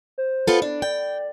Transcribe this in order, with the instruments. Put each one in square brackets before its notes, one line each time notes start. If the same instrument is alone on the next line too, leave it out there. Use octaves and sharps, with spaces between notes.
[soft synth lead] C5
[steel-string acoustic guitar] B3 F4 A4
D4
[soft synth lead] D5 [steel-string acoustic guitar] G5